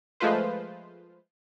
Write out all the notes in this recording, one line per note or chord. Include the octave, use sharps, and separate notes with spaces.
F3 G#3 A3 F4 B4 C5